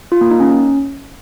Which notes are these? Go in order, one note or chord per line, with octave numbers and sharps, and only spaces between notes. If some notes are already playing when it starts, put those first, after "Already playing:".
F4
A#3
D#4
C#4